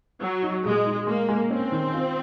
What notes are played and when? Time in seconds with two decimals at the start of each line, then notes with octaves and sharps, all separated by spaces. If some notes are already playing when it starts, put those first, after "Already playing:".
0.21 F#3 F#4
0.43 D#4
0.65 A#2 G#3
0.86 D#4
1.07 G#3 A#3
1.29 G#3
1.50 C4 C#4
1.72 D#3
1.94 F4